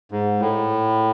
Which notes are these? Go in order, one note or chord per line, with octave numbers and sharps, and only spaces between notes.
G#2
A2